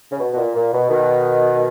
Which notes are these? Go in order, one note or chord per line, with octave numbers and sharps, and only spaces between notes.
C#3
B2
B2
A#2
A#2
B2
B2 D#3